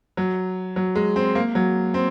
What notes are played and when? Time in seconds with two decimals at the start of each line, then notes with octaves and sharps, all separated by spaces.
0.17 F#3
0.76 F#3
0.96 G#3
1.16 C4
1.35 A#3
1.55 F#3
1.94 C4